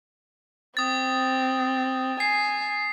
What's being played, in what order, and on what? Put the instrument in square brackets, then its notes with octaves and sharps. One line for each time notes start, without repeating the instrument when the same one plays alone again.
[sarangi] C4 [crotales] D#6 A6
[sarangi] G#5 [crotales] C7